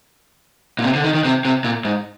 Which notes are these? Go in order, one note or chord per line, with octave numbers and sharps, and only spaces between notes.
A#2
C3
D3
D#3
D#3
C3
C3
A#2
G#2